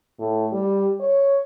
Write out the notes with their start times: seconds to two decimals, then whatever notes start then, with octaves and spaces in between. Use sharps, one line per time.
0.19 A2
0.52 G3
1.00 C#5